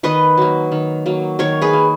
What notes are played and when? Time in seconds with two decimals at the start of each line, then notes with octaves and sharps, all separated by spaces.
0.03 D#3 B4 D#5
0.37 F#3 A#3
0.72 D#3
1.06 F#3 A#3
1.39 D#3 A#4 C#5
1.62 G#4 B4
1.73 A#3